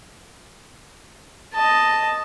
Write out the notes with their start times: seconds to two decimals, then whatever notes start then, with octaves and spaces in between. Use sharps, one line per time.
1.54 D#5 A5